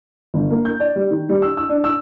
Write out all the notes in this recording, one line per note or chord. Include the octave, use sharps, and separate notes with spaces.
G1
A#3
G6
D5
G3
D#3
G3
E6
E6
D4
E6